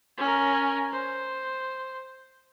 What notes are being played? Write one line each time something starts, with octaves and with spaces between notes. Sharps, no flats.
C#4 A#4
C5